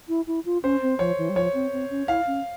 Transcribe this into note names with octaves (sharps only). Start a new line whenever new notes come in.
E4
E4
F4
C#4 C5
C4
F3 C#5
E3
G3
F3 C#5
C4
C4
C#4
E4 F5
C#4